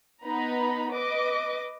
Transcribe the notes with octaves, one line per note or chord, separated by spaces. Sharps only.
B3 D#4 A#5 B5
B4 D#5 D6